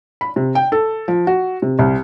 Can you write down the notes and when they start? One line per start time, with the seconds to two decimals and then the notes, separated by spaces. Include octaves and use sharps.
0.21 B5
0.36 C3
0.55 G5
0.72 A4
1.08 F3
1.27 F#4
1.62 C3
1.79 C2